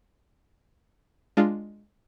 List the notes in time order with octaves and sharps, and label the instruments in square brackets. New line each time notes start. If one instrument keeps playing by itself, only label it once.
[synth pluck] G#3 D4 F4